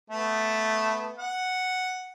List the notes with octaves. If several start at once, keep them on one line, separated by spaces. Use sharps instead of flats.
A3 B3
F#5